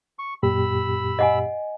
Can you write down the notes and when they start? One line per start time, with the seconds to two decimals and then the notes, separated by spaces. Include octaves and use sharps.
0.19 C#6
0.43 F#2 A#2 G4 B5 E6
1.19 D#5 F#5 G#5